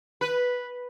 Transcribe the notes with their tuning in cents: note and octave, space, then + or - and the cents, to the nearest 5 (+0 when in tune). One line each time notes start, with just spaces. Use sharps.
B4 -5